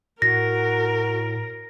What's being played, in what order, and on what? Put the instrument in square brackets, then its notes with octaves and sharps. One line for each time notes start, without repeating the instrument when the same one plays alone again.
[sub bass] A2 [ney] F#4 [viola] A#4 [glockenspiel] A#6